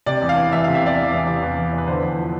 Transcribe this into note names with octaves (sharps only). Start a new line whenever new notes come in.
C3 D5
E2
F5
E3
E2 E5
C3 F5
E5
E2 D5
E3
E2
C3
E2
E3
E2
B4
D3 C5
E2
F3